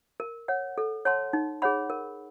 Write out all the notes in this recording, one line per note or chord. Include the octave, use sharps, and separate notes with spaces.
A#4
C#5 F#5
A4
C#5 F#5 A5 C6
D#4
G#4 C#5 F#5 B5
A#4